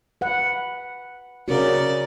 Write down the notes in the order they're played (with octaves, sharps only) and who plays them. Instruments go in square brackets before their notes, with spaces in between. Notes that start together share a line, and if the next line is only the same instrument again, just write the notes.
[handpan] B4 F#5
[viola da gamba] C#3 D5 [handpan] F#4 A#4